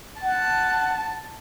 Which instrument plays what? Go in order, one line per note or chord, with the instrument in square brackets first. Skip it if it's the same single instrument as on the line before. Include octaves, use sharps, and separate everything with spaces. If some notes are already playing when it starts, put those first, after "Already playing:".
[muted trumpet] F#5 [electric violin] A5